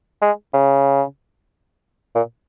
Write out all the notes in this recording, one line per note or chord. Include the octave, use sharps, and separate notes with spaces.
G#3
C#3
A#2